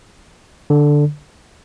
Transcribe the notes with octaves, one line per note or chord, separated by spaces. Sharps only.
D3